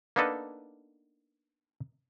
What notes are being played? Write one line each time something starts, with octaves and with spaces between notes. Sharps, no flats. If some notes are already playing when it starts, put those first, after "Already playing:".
A#3 B3 D4 D#4 A4 B4